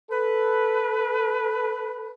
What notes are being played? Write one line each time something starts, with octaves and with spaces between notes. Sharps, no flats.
A4 B4